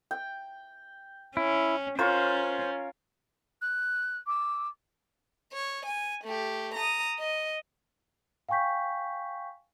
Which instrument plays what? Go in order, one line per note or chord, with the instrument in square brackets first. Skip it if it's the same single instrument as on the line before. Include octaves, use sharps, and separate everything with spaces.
[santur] G5
[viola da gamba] C#4 [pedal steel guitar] E4
[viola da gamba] C#4 [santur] F4 A#4 C#5 [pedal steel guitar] C5
[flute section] F#6
D6 E6
[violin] C#5
G#5
A3 G4
A#5 D#6
D#5
[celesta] F5 G5 G#5 C#6 G6 B6